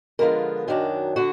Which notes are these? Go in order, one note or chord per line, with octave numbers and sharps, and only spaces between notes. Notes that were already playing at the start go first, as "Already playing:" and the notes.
D3 F3 G#3 B3 F4 A#4
F#2 D#3 F#3 D4
D3 F#4